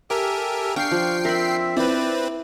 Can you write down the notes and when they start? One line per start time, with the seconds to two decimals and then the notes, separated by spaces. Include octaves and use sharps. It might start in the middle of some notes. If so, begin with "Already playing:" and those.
0.10 G4 A4 A#4 E5 G#5
0.76 D4 F5 G5 C#6 C7
0.91 F3
1.25 C4 A#4 E5 B5
1.77 C4 E4 B4 D5